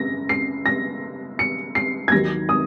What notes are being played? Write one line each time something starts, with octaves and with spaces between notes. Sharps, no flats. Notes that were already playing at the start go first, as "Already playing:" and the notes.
Already playing: F#2 C#3 A#6
C7
A#6
C#7
C7
G#6
D#2 D#3 F#3 A#6
D#6